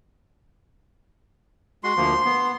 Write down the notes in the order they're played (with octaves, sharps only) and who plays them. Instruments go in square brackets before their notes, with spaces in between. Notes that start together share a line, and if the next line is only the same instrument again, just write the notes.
[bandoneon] G#3 F#4 [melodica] C6
[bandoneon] D2 F3 A#3
B3